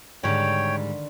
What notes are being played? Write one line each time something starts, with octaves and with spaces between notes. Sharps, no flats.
G#2 D3 D#3 G3 C#5 G5